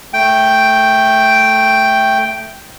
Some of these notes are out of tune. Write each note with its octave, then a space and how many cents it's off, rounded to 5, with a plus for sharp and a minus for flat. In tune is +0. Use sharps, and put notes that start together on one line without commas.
A3 +0 G5 +0